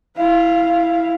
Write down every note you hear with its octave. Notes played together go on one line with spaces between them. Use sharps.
E4 F5